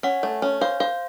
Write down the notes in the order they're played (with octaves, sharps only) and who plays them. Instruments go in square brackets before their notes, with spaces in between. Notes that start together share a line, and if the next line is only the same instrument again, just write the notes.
[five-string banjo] C#4 [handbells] F#5
[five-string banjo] A3
C#4
[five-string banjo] C5 [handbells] F5
[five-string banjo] C5 [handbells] F5